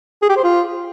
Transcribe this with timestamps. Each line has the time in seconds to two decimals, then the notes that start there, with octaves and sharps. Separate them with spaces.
0.22 G#4
0.29 G4
0.37 C5
0.44 F4